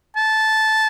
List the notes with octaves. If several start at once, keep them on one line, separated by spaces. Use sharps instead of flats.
A5